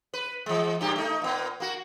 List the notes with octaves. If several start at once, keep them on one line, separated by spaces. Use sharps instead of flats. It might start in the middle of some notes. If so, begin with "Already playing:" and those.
B4
E3 G#3
G2 A#2 G4
A3 D#4
A#2 B3
A#3 F#4